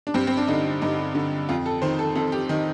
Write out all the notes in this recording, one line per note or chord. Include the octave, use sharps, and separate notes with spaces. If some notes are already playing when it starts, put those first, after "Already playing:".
D4
G2 C4
C4
D4
D3 D#4
G2 D#4
D3
F2 F4
A4
D#3 C5
A4
F2 A4
G4
D#3 D#4